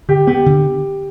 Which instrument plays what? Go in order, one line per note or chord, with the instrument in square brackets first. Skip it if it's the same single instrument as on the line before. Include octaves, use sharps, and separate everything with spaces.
[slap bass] D3 [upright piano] G4
[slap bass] B3 [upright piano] G4
[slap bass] D3